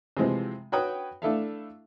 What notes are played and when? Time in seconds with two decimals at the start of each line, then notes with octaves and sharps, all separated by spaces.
0.17 C3 E3 F3 G#3 C4
0.72 F#4 B4 C#5 G5 D#6
1.22 A3 D4 E4 A4 E5 F5